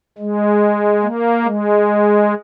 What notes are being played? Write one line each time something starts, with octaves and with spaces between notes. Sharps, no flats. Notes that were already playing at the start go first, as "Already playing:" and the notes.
G#3
A#3
G#3